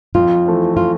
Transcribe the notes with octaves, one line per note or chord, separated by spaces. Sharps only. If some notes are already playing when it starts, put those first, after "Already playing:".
F2 F4
E3 A3 C4
F4